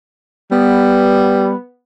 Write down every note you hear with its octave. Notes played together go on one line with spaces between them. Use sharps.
G3 B3